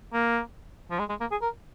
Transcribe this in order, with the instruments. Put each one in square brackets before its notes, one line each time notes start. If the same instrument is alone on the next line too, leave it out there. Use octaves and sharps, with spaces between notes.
[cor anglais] A#3
F3
G#3
G#3
A#3
G#4
A#4